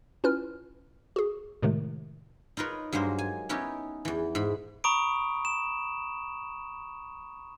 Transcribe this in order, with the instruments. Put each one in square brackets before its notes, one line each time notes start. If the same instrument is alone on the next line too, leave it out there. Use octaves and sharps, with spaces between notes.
[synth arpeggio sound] C#4 E4 F4 B4 F6
F#4 G#4
A2 C3 D#3 G#3 A3
[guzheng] D#4 F4 A#4 B4 C#5
G2 F#3 G#3 A#3 C5
G#5
B3 C#4 D#4 E4 G4
E2 E3
G#2 B5
[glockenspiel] A#5 B5 C#6 D#6 D7
E7